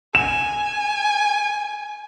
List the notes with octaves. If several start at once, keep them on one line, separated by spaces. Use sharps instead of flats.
G#5 E7